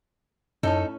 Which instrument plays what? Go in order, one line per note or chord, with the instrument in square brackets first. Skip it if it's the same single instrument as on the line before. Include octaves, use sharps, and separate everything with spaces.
[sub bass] F#2 [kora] A2 C#4 [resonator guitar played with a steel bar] D#4 A4